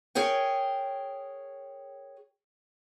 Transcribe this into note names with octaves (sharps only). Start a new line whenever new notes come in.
G#4 A#4 C#5 G5